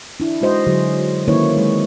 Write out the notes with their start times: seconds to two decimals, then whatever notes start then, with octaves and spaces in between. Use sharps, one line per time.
0.20 D4 E4
0.41 G#3 F#4 C5 D#5
0.67 D3 F#3 G#4
1.28 D#3 A#3 C#4 E4 B4 C#5
1.57 G#3